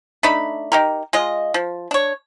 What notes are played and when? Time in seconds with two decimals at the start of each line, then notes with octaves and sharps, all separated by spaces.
0.23 A3 D4 D#4 B5
0.72 D#4 G4 A#4
1.13 G#3 F4 D#5
1.54 F3
1.91 D4 C#5